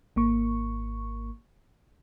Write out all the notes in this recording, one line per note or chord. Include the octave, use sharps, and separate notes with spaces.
G#1 A#3 C#6